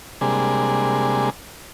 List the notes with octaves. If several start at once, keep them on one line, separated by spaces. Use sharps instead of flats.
C3 G3 G#3 A#3 D4 G#4